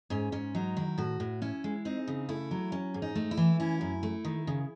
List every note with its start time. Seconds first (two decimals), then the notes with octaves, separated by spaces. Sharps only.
0.10 G#2 C#4
0.32 G#2 C#4
0.55 F#3 D#4
0.76 D#3 E4
0.98 A2 F#4
1.20 A2
1.42 C#4 E4
1.64 G#3
1.85 C4 D#4
2.08 C#3
2.29 A3 E4
2.51 F#3
2.72 C#4
2.94 G#2
3.02 D#4
3.15 A3
3.31 E4
3.37 E3
3.60 C#4 E4
3.81 F#2
4.03 A3
4.25 D#3
4.47 C#3